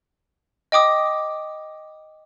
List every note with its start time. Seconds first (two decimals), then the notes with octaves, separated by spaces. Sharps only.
0.72 D#5 G5 D6 D#6